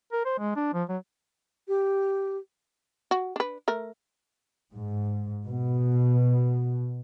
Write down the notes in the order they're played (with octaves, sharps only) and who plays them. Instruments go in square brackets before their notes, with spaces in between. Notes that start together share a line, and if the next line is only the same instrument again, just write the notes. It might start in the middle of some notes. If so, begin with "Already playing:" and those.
[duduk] A#4
C5
G#3
D4
F3
F#3
[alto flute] G4
[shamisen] F#4
D4 B4
A3 A#4
[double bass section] G#2
B2